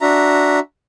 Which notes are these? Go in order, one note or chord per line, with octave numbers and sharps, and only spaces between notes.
D4 F#4 E5 A#5